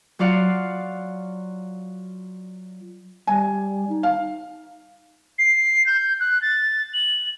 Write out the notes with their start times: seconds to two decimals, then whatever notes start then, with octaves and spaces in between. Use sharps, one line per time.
0.19 F#3 F4 D5 F5 F#5
3.27 G3 G#5
3.89 D#4
4.03 F5
5.38 C7
5.86 G6
6.20 F#6
6.42 A6
6.94 F#7